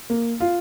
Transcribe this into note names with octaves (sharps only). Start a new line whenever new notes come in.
A#3
F4